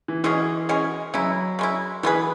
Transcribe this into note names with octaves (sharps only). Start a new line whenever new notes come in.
E3
B2 E3 G#3 C#4 G#4
B2 G#3 C#4 G#4
C#3 F#3 G#3 E4
C#3 G#3 E4
B2 E3 B3 G#4 B4